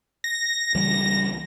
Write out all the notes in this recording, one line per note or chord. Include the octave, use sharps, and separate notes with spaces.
A#6
C#2 E3 G3